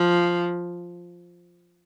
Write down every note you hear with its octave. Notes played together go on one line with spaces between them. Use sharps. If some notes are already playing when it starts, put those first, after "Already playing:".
Already playing: F3